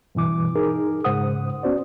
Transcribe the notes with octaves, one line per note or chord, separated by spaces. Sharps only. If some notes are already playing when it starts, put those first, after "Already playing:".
G2 B2 E3 D6
D#4 G#4 A#4
G#2 C#3 C5 F#5 D#6
B3 C#4 F#4 C5 D5